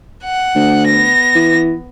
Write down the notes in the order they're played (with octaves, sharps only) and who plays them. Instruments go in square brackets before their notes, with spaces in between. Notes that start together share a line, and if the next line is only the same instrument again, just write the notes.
[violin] F#5
[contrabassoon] D2
[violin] B3 A#6
[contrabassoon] E3